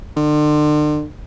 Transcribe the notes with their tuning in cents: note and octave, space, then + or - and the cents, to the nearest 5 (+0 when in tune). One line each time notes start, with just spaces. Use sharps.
D3 +40